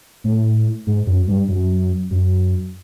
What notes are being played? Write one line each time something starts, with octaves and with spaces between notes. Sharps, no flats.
A2
G#2
F#2
G2
F#2
F#2